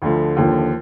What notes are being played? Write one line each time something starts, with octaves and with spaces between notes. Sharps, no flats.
D2 D3 F3
D#2 D3 F3